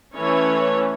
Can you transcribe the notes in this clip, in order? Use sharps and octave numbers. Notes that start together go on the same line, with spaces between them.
E3 A3 C#4 C#5